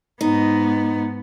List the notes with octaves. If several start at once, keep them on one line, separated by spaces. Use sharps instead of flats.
G#2 B3 D#4